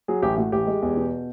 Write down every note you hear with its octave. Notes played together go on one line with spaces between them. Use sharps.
F#3 G#4
A1 G4
A2 F#4
A1 G4
G#3
E2
B2